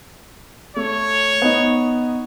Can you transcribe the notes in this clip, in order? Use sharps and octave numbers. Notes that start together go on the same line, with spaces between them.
A3 C#5
B3 D#4